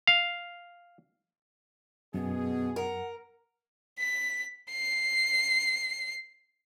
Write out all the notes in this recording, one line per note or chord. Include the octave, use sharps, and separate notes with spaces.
F5
F#2 B2 B3 G#4
A#4 F#5
B6
C7